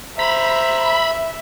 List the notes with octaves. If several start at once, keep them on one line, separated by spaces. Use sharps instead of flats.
C5 E5 A#5 B5